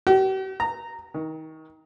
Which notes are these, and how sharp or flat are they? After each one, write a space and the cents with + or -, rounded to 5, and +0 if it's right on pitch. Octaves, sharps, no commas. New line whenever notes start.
G4 -45
A#5 -10
D#3 +25